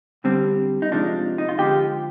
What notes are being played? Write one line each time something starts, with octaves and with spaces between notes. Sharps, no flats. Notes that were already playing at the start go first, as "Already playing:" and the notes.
D3 G3 C4
D#4
C3 F3 G#3 D4
D#4
F4
D3 F3 G#3 G4